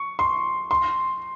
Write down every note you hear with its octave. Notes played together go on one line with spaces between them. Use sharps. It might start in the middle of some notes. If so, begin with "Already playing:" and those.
Already playing: C#6
C6
C6